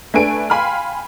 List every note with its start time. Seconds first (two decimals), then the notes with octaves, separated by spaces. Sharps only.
0.14 A3 D4 B4 G#5 D7
0.50 F5 G5 G#5 B5 C6 F6